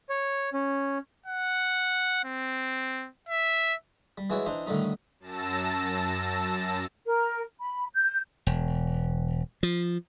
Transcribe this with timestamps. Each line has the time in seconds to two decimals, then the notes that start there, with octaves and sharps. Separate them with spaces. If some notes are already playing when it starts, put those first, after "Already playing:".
0.09 C#5
0.53 C#4
1.26 F#5
2.24 C4
3.29 E5
4.18 G3
4.30 E3 G#3 E4 F#4 C#5 D5
4.46 E3 D4 D#4 C5
4.67 A2 D3 D#3 G3 D#4
5.20 F#2 A5 E6 A#6
7.06 A#4
7.60 B5
7.94 G6
8.47 E1
9.63 F3